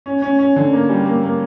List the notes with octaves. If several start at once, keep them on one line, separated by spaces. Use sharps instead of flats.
C#4
C#4
C#4
D3
A#3
G3
A#3
A#3